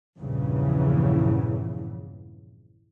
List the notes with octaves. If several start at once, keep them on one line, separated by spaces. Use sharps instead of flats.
A#1 E2 G2 C#3 E3